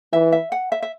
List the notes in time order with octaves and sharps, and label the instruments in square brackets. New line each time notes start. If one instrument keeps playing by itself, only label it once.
[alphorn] E3 [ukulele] E5
[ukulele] E5
F#5
E5
E5